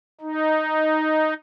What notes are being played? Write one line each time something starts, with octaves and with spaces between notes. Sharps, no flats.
D#4